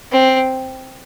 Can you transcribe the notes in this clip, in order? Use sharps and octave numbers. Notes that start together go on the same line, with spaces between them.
C4